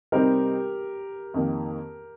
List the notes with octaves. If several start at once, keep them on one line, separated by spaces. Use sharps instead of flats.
C3 G3 C4 D#4 G4 A#4
F2 D#3 A#3